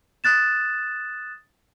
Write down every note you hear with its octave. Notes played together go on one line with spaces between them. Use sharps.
D#6 F#6 A6 E7